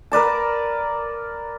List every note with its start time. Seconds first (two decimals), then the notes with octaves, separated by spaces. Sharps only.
0.12 A#4 B4 D5 A5